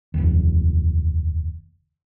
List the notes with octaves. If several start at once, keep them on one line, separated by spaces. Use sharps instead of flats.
F1 D#2